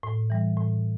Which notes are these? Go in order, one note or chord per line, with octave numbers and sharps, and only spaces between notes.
A2
E3 G3
A2